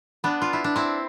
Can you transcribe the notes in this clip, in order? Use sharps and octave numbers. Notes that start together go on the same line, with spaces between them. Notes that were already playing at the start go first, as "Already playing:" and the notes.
B3 D4
F4
E4
D4
C4 E4